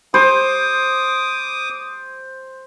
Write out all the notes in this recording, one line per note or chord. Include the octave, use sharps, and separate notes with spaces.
C5 D6 D#6